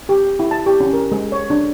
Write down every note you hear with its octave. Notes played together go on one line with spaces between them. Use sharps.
G4
E4
A5
G4
C#4
A#4
G#3
C#5
D4